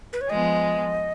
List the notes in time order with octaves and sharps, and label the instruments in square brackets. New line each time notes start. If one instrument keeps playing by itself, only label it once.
[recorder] B4
C#5
[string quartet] F3 G#3 B3 [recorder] D#5